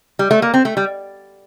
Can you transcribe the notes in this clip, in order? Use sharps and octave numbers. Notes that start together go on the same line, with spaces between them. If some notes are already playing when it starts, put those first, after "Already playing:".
G3
A3
A#3
C4
A3
G3